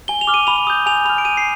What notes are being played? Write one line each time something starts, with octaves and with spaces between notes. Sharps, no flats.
G#5 G7
F7
D6 F6
D#7
B5 F7
D#6 G6
G#5 F7
B5 F6 F7
D7
G#5 D#7
C7